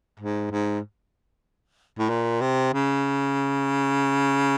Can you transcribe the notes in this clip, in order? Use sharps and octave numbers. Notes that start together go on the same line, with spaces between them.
G#2
G#2
A2
A#2
C3
C#3